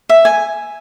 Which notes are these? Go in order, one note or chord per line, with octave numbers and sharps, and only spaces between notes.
E5
G#5